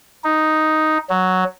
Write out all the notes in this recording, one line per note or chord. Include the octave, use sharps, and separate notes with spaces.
D#4
F#3